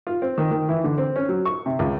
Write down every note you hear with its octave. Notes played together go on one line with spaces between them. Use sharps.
F4
C4
D#3
D#3
E3
D3
C4
C#4
F#3
C#6
C3
C#2